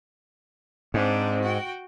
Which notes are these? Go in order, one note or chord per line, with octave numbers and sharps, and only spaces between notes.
G#2 C4 D4
F#4 G5